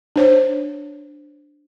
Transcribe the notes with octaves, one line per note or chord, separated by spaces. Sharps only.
D4 C5 C#5